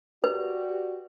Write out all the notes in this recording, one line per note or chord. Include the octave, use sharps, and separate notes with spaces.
F#4 G4 B4 D5